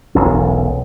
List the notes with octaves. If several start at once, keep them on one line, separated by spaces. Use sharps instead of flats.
E1 B1 C#4